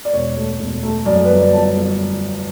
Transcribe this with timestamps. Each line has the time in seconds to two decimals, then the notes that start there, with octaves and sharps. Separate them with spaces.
0.05 D5
0.13 E1 C#5
0.37 A3
0.60 E1
0.83 A3
1.05 F#2 D5
1.17 D5
1.25 B4
1.30 G1 C#5
1.41 D5
1.52 G1 A5
1.76 G1